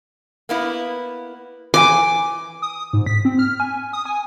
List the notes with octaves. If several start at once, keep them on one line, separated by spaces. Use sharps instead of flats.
A#3 B3 E4
E3 D#5 G#5 D6
D#6
G#2
B6
C4
F6
G#5
D#6
G#5